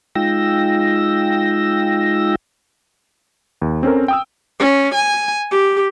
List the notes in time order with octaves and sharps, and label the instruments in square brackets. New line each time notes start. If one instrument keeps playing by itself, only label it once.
[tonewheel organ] G#3 D#4 F4 G5 E6 A#6
[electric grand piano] D#2
C4 C#4 A4 A#4
G5 D#6 E6
[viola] C#4
G#5
G4